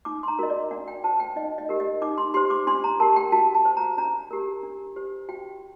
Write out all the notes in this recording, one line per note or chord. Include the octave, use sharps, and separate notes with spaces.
D#4 D6
C6
A#5
F#4 A#4 D#5
D5
D4 F#5
G5
F#4 C5 A5
G5
D#4 D#5
D#5
G4 A#4
D#5
D#4 D6
C6
G4 C5 C6
D6
D4 C6
A#5
G4 A#4 A5
G5
F#4 A5
A5
C5
A#5
D4 A#5
G4 A#4
D4
G4 C5
F#4 G5